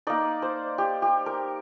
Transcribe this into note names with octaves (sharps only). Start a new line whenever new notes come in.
A#3 D#4 D5
C5
G4
G4
A#4